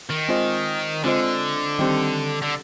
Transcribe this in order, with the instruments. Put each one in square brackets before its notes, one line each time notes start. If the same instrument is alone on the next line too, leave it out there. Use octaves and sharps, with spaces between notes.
[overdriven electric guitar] D#3
[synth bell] G#3 C4 F4 C5 D#5
[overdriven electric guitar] D3 [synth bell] G#3 C4 F4 C5 D#5
[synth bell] D#3 G3 C4 G4
[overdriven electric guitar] D3